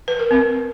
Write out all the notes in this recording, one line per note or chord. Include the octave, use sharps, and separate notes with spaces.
B4
A#4
C4